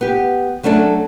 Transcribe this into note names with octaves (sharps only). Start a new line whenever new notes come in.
B3 G4
F#3 A3 C#4 D4 A4